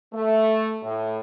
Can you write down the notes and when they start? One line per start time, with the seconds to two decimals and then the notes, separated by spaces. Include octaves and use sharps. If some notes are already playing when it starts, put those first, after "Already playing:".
0.14 A3
0.83 A2